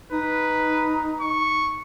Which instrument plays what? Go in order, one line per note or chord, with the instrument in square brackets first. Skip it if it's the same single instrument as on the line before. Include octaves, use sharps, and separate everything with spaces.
[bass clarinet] D#4 [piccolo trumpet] B4
[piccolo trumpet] C#6